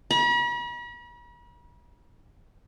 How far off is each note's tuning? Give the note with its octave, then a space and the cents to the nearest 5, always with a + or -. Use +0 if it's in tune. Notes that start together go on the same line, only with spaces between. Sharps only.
B5 -45